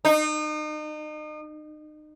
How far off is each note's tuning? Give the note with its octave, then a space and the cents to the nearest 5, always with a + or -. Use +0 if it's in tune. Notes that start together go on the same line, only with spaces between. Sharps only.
D#4 -35